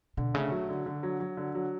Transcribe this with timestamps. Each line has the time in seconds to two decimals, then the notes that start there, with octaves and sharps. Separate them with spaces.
0.17 B2 D3
0.34 C#3 A3
0.51 F#3
0.69 D3
0.86 D3
1.03 F#3
1.20 F#3
1.37 D3
1.55 F#3